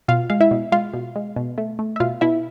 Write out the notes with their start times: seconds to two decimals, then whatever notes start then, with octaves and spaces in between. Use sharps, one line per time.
0.08 B2 F4 F5
0.30 G#3 F5
0.41 E4 E5
0.51 B2
0.72 G#3 F4 F5
0.94 B2
1.16 G#3
1.36 B2
1.58 A3
1.79 A3
1.96 E5
2.00 B2 F4 F5
2.21 B2 E4 E5